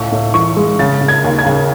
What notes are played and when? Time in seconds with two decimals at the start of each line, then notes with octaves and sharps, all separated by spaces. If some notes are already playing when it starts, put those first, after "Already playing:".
Already playing: C#2 A2 C#6
0.12 A2
0.34 E3 C#6
0.57 G#3
0.79 C#3 A6
1.01 C#3
1.08 G#6
1.24 D#2
1.39 G#6
1.46 C#3